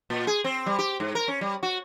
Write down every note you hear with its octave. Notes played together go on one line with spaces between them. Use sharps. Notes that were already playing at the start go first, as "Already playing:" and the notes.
A#2
G#4
C4
G3
G4
G#2
A#4
C#4
G3
F#4